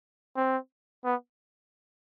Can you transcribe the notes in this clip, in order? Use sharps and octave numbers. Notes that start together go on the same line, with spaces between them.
C4
B3